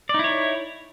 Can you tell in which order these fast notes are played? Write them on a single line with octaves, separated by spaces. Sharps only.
D5 D#4 E4 C#5